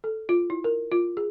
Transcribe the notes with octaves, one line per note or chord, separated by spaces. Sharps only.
A4
F4
E4
A#4
F4
G#4